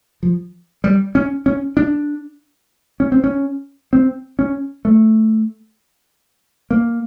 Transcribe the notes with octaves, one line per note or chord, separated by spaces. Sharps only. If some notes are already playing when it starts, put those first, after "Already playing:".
F3
G3
C#4
C#4
D4
C#4
C4
C#4
C4
C#4
A3
A#3